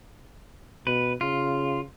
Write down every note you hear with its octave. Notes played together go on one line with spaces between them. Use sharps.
B2 B4
C#3 F4